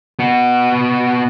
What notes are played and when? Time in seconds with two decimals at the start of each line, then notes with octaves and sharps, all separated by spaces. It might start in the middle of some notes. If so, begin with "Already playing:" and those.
0.19 B3 F#4